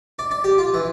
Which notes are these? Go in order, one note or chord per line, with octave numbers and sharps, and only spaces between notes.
D5
D5
G4
F4
E3